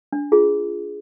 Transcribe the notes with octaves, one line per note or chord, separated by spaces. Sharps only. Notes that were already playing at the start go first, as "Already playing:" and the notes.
D4
F4 G#4